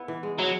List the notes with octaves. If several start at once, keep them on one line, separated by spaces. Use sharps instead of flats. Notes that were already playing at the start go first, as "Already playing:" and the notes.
Already playing: B3 E4
E3
G#3
F#3 E4